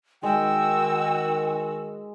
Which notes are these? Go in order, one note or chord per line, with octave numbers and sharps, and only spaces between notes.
D#3 G#3 F#4 G5 E6